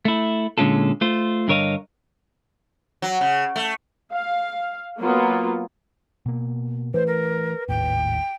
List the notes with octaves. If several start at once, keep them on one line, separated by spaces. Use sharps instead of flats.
A3 E4
A#2 D3 G#3 C#4 F4 A4
A3 F4 C5
G2 D3 A#4 C#5 D#5 F5
F#3
C#3
A3
F5
F#3 A#3 B3 F4
B2 A#3
E3 A3 B4 C5
A#4
G#1 D#2 A2 G5